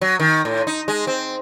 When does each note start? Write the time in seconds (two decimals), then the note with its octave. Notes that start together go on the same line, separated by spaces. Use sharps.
0.01 F#3
0.20 D#3
0.45 A2
0.67 D#4
0.88 G#3
1.07 C4